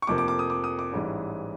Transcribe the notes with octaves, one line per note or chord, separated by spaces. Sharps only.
C#6
F1 F2 C3 F3 A#3 D6
D6
D6
D#6
D6
D#6
D6
A1 G#2 E3 G3